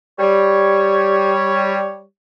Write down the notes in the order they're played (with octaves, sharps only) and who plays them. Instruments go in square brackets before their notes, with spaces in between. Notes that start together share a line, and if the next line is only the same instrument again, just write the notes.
[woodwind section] G3 C#5